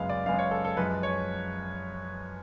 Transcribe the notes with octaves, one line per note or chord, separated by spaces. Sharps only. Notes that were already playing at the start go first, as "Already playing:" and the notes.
Already playing: F#2 C#3 G#3 B3 F5
D5
F#2 C#3 G#3 B3 F5
C#5
A4
A4
F#2 F3 G#3 B4
C#5